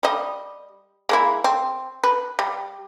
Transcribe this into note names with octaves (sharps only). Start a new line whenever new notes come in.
G3 D#5
G#3 A#3 E4
C4
B4
G3